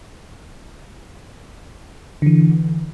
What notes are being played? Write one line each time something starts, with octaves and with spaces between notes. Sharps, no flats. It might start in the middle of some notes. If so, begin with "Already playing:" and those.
D3 E3